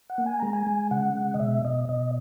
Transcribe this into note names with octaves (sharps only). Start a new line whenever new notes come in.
F#5
A#3
G#5
G#3 A#5
G#5
G#3
C#3 F#5
G#3
D#5
B2 E5
B2 D#5
B2 D#5